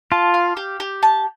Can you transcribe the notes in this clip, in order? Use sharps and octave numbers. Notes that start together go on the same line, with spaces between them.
F4 A5
F5
G4
G4
A5